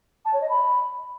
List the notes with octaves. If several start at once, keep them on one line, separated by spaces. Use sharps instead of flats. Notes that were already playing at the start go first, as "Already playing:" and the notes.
A5
C#5
D#5
B5